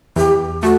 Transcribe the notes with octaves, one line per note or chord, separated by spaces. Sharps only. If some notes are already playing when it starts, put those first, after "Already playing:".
E2 G4
A3 F#4